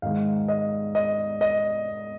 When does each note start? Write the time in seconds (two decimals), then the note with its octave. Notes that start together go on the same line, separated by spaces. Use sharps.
0.02 G#2 D#3 G#3 F5
0.48 D#5
0.95 D#5
1.41 D#5